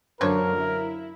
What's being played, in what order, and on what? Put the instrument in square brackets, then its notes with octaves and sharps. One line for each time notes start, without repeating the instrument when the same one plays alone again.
[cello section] F#2 D3 F#3 [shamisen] F3 D4 C#5 [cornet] A#4
[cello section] E4